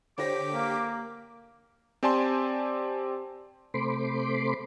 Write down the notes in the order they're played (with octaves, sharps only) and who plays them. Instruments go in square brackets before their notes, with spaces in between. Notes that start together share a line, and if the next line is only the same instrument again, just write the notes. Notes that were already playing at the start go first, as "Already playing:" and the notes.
[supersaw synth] D3 G4 B6 [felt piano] C5 C#5 A#6 [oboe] D6
[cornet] A#3
[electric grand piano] C4 G4 D5 G#5 A5 C6
[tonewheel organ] C3 A3 C5 B5 C6 D6